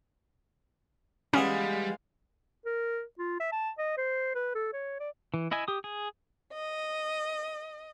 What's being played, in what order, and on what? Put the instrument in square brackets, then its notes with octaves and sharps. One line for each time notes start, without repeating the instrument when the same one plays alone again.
[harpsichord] E3 B3 E5 [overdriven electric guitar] G3 [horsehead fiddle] G#3 F5 [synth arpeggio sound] C#4
[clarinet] A#4
F4
E5
A5
D#5
C5
B4
A4
C#5
D5
[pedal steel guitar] E3
E4 D#5 E5 G#5
G4 D#6
G#4
[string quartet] D#5